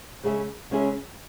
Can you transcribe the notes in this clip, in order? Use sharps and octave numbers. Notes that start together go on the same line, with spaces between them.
C#3 G#3 C#4 G#4 E5
C#3 G#3 C#4 G#4 E5